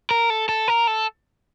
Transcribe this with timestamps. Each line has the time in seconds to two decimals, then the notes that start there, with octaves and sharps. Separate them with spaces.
0.11 A#4
0.30 A4
0.49 A4
0.68 A#4
0.87 A4